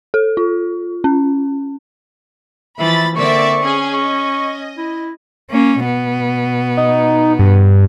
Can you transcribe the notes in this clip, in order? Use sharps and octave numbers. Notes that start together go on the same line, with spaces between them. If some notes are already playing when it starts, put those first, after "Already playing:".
A4
F4
C#4
E3 F3 E5 B5 A6
D3 A#3 C4 D5 E5 C#6
C#4 G#4
D#5 C#6
E4
A#3 C#4
B2 B3
D#4
G2